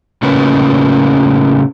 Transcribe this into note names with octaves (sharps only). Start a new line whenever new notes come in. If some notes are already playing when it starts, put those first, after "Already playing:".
A2 C#3 A#3 C#4 B4